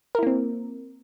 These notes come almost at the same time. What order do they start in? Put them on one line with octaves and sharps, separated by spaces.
A#4 E4 A#3 C4